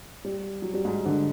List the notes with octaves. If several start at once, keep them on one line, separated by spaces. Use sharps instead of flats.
G3
F#3
G3
G#2 G#3
D3 D4